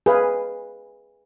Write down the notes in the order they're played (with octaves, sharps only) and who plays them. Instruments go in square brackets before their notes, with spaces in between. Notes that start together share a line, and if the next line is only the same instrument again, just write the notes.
[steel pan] G#4 B4 F5